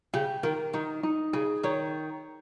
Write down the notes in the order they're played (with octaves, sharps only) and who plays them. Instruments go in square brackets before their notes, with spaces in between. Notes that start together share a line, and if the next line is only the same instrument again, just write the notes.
[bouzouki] C#3 [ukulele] G4
[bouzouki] D#3 [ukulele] A#4
[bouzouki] D#3 [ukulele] D#4
[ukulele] D#4
[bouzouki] C#3 [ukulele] G#4
[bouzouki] D#3 [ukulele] C#5